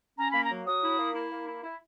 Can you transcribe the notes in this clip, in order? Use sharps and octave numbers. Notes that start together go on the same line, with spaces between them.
C#4 A#5
A#3 B5
A#5
F#3
F#3 D#6
E4
A#3
E4
A#3
E4
E4